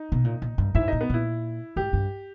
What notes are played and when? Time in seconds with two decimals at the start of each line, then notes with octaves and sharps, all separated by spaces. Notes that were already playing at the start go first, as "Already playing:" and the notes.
Already playing: D#4
0.12 B2
0.24 A#2
0.42 A#2
0.58 G2
0.75 G#2 E4 E5
0.88 A#2 D#4 D#5
1.01 B3 B4
1.10 A#2 E4
1.76 G#2 G4
1.93 G2